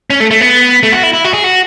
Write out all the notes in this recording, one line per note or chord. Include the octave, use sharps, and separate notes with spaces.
C#4
A3
A3
B3
A3
F#4
E4
E4
F#4
G#4
F#4